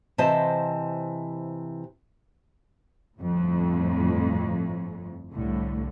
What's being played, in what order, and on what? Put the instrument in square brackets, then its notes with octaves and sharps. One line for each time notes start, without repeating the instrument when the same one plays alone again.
[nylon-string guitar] C3 E3 C5 D#5 E5 A5
[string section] G1 F2 A2
C2 A2 D3